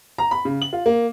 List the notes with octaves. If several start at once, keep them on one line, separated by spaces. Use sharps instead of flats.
A#5
B5
C#3
F#7
F4
A#3